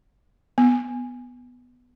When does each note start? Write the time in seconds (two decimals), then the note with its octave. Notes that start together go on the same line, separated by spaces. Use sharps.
0.58 B3